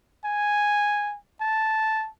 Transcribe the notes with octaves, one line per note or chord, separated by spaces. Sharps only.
G#5
A5